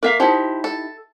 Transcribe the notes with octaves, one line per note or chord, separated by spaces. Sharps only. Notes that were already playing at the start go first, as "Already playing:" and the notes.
A#3 A#4 E5 F5
F3 D#4 E4 G4
A4